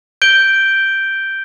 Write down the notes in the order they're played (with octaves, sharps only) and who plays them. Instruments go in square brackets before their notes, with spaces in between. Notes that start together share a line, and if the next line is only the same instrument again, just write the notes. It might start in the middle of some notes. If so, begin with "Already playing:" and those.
[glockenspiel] G6 D7 G7